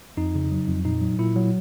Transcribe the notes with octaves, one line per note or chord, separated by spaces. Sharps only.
F2 D#4
C#3
F#3
F2
A#2 D#4
F#3
A#2 E4
F#3